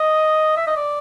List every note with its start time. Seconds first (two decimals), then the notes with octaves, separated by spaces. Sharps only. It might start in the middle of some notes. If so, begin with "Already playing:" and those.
Already playing: D#5
0.57 E5
0.67 D#5
0.77 D5